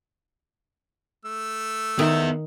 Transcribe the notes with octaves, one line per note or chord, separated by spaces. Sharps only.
A3 E6
D#3 B3 E5